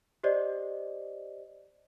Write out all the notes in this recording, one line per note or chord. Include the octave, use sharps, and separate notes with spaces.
G4 C5 D5 D#5